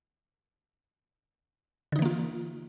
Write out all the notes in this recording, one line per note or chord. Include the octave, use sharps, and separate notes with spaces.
D3 E3 A#3 D#4 F4